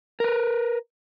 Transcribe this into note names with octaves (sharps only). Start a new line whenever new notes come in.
A#4 B4